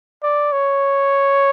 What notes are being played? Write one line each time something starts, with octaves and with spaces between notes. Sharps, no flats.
D5
C#5